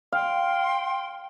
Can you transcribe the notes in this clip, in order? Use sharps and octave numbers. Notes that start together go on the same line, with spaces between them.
F5 G5 C6